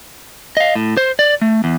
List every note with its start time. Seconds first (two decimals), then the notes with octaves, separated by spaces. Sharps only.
0.57 D#5 F5
0.75 A2
0.97 C5
1.19 D5
1.42 A3
1.64 E2